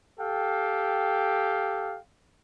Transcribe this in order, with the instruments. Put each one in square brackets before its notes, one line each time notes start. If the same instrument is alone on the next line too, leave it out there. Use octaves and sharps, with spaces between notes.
[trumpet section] G4 A4 F5 G5